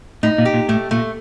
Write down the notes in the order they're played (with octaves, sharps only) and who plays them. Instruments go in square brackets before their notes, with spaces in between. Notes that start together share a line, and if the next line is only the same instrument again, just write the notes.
[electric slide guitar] A2 [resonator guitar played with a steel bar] D#4
[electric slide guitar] A#2
[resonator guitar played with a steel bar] G4
[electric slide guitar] A#2
[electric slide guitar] A2 [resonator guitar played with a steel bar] A3
[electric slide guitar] A#2 [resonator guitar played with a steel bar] A3